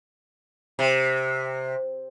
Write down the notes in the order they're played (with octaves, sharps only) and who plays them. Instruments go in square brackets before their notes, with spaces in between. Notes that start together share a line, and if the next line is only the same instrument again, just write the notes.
[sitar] C3